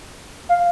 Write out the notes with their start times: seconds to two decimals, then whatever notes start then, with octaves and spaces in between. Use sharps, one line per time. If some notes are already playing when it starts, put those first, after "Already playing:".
0.49 F5